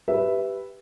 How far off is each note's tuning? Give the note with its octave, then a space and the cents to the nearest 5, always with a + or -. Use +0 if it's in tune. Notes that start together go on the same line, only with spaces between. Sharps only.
G4 +0 B4 +0 E5 +0